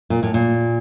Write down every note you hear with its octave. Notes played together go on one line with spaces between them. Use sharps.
A#2
A2
A#2